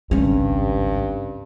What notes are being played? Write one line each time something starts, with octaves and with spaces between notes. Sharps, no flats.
G#1 C#2 G2 G3 C4 C#4